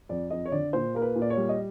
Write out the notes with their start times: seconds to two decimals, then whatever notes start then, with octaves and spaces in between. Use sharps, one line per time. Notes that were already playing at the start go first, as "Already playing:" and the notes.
0.09 F2 D5
0.30 F2 D#5
0.46 C#5
0.52 D3 D5
0.73 A#2 C5
0.95 A#3 A#4
1.02 B4
1.15 A#2
1.22 D5
1.30 C#5
1.37 G3
1.49 D#5